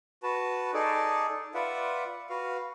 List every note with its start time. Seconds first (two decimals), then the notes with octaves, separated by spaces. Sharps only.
0.23 F#4 B4 A5
0.74 D#4 G#4 A4 D5
1.54 F4 B4 D5 E5 F#5
2.30 F#4 B4 F5